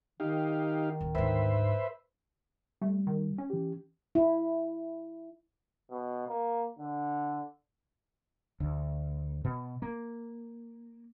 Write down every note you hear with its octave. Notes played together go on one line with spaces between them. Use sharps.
D#3 D#4 G4 F5
D1
D2 G#2 B4 C5 E5
G3 A3
D#3
C#4
E3 G4
E4
B2
A#3
D3
D2
B2
A#3